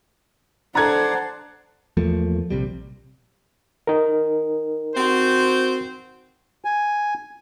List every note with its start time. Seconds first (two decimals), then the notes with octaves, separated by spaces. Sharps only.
0.75 D4 A4 C5 D5 F#5 A5 A#5 G#6
1.97 E2 F3 A3 A#3
2.51 A#1 C3 G3
3.87 D#4 A#4
4.96 C4 F#4 C5
6.65 G#5